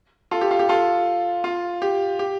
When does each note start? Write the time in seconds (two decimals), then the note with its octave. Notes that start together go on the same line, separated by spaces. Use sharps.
0.31 F4 A4
0.41 G4
0.51 F4
0.59 G4
0.69 F4 A4
1.44 F4
1.82 G4
2.19 G4